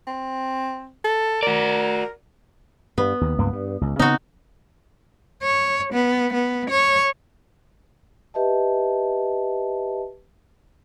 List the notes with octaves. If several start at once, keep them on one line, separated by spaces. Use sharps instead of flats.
C4
A4
F#4 A#4 D5
G2 B3
D#2
C#2 G2 A#3
G2
C#2
C#3 B3 C4 D#4 F#4
C#5
B3
B3
C#5
G4 B4 D#5 E5 A5